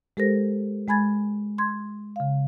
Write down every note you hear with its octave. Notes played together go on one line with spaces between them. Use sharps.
G#3 G4 A4 A#4 C5 A#6
G#3 G#5 B5 G#6 A6
C6 G#6
C#3 F5